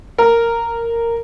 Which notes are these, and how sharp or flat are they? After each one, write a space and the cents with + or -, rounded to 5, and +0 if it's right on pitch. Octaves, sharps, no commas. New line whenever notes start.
A#4 -10